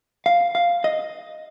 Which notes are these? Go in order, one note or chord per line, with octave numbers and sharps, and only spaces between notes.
F5
F5
D#5